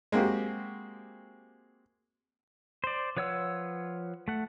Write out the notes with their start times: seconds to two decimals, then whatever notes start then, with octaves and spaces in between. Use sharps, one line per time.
0.12 G#3 A#3 C4 F#4 G4
2.84 C5 D5
3.17 F3 B4 C#5 F#5 E6
4.28 A3 F#5